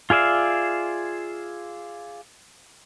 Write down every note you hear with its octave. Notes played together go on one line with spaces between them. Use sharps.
F4 G#4 D5 E5 F5